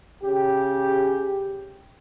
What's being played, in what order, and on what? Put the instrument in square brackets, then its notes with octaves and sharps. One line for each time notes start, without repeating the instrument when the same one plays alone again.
[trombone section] C#3 G4